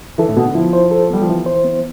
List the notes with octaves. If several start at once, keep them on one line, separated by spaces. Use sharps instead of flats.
E3 A4
A2
B2 B3
D3
F3 E4
C5
A4
G3 B3
F3
E3 E4
C5
B3